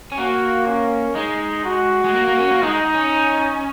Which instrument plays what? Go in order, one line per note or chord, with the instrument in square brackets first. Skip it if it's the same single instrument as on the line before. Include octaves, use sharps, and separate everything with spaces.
[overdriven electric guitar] C#4
[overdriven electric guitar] A#3 [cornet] F#4
[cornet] C#4
[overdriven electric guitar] G#3 [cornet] D#4
[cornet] F#4
[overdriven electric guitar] G#3
A#3
A#3
C#4
A#3
[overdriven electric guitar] G#3 [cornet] D#4
[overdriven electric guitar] C#4